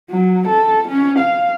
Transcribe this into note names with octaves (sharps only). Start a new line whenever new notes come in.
F#3
A4
C#4
F5